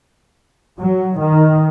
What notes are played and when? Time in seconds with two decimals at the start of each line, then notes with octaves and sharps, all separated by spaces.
0.78 F#3
1.20 D#3